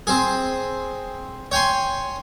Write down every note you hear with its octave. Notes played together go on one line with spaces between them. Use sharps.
C4 G#4
C#5 G5 G#5 C6